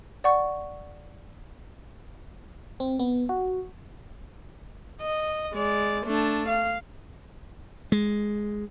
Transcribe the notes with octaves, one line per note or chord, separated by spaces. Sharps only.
D5 F#5 C#6
C4
B3
F#4
D#5
G#3 D5
A3 D4
F5
G#3